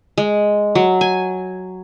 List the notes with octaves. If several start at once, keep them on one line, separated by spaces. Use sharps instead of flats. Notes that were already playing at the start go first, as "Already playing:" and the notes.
G#3
F#3
G#5